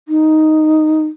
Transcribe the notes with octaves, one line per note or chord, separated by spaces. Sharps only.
D#4